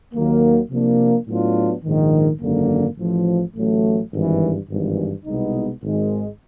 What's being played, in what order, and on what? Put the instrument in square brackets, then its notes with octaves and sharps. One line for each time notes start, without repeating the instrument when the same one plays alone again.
[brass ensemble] D#2 D#3 F#3 A#3
C3 F3 A#3 D4
A2 F#3 B3 D4 F4
A#1 G#2 D#3
G#1 F#2 D3 F#3 A#3
A1 A2 F3
A1 A2 F#3 A3
G#1 G2 E3
G#1 G2 E3
C2 B2 G#3 B3 D#4
G#1 G#2 D#3 G#3